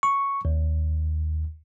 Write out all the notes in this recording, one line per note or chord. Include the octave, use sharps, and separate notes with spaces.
C#6
D#2